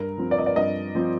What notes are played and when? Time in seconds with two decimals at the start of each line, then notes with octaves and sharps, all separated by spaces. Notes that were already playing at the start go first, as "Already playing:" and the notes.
Already playing: G2 A#4
0.18 F3 C4
0.31 D5
0.38 D#5
0.46 D5
0.56 G2 D#5
0.95 F3 C4